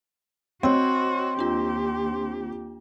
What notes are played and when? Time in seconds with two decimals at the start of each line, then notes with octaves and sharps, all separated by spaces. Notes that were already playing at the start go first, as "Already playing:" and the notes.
0.63 C4 F#4 C#5 D#5 C6
1.39 D#2 D4 F4 G4